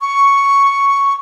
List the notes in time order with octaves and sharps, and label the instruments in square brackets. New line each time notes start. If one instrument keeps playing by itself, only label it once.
[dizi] C#6